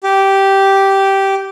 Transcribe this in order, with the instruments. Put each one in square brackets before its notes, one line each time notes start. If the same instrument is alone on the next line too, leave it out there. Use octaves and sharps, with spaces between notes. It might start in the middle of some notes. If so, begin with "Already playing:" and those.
[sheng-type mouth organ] G4